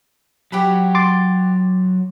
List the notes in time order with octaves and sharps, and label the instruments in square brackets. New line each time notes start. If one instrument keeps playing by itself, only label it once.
[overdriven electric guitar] F#3 [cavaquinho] G4 F#5 B5
[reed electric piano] C6 D6 A6